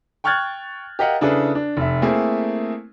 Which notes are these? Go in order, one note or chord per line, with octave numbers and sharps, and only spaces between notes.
G5 C#6 F6 F#6 G#6 A6
G4 A#4 D#5 F5 F#5
C#3 D4 E4 G#4 A4 B4
D4
F1 E5
A3 A#3 C4 E4 G#4